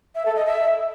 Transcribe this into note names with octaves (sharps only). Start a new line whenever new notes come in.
E5
A4
D#5
E5